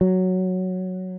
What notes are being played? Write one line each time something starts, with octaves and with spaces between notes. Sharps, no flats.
F#3